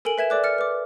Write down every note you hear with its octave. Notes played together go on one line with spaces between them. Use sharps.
A4 A#4 G#5 D7 F#7
B4 E5 G#6 E7
A4 D5 D6 F#6
F6 A6 C#7
B4 D6